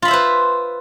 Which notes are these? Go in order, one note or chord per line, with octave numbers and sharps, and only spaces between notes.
F4 B4 C5 E5 B5